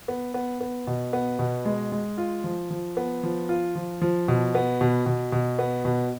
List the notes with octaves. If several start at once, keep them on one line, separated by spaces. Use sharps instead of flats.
B3
B3
B3
B2
B3
B2
G#3
G#3
F4
F3
F3
B3
F3
F4
F3
F3
B2
B3
B2
B2
B2
B3
B2